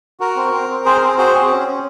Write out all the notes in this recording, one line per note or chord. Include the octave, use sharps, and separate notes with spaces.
F#4 A#4
C4
C4
C4
C4 G#4 C5
A#4
C4
G#4
F#4 G#4 C5
C4 G#4
C#4
C#4